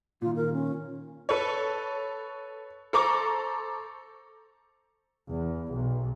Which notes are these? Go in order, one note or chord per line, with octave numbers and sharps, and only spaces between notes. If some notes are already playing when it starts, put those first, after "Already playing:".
A#2 D#3 F4
A#4
C#4
A4 B4 C#5
A4 C5 A#5 C#6 D6
E2
B1